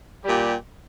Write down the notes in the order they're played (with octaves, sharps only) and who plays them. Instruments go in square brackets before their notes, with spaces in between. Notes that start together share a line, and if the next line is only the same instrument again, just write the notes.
[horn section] A#2 G3 G4